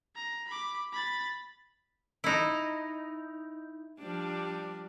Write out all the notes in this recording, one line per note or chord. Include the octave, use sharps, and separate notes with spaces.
A#5
B5 D6
B5 A6
D#4 E4
F3 G3 D4